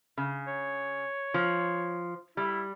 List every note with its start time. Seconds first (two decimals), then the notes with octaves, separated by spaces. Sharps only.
0.18 C#3
0.48 C#5
1.34 F3
2.37 G3 E4